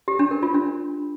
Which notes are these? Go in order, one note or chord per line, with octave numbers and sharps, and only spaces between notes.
G4
D4
A#4
F4
D4